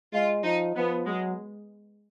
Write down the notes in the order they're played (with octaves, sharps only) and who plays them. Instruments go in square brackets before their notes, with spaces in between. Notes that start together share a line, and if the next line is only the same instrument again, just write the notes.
[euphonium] G#3 [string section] F4
[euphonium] F3 [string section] D#4
[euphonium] F3 [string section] B3
[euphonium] F#3 [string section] G#3